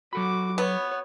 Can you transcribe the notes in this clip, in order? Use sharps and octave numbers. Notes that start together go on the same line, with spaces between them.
F#3 F#4 A4 B5 D6
B3 C#5